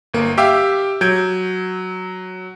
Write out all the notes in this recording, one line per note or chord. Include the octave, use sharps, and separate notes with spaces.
G1 A#3
G4 E5 F5 G5 D6 E6
F#3 G6 G#6 D7